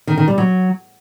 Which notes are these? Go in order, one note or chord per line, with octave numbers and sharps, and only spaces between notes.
D#3
D#3
G3
F#3